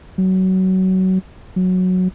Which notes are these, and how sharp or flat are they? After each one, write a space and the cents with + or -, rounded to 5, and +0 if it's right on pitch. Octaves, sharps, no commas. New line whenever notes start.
F#3 +20
F#3 -10